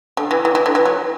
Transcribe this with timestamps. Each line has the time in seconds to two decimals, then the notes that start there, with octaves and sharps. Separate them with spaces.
0.17 D3
0.31 E3
0.45 E3
0.55 E3
0.66 D3
0.75 E3
0.86 F#3